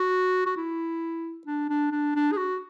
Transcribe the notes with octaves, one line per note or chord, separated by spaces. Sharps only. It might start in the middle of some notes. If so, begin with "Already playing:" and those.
Already playing: F#4
F#4
E4
D4
D4
D4
D4
G#4
F#4